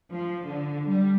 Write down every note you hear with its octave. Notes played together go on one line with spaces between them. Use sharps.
F3
D3
G3